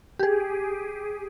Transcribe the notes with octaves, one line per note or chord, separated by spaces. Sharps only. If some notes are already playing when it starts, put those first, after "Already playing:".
G4 G#4